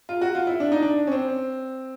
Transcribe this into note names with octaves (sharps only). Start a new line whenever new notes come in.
F4
F#4
F4
E4
D4
D#4
D4
C#4
C4